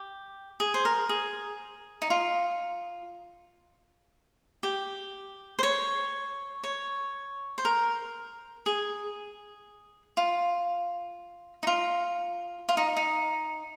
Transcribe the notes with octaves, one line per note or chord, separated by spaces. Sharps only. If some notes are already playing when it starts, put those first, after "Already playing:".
Already playing: G4
G#4
C5
A#4
G#4
D#4
F4
G4
C5
C#5
C#5
C5
A#4
G#4
F4
D#4
F4
F4
D#4
D#4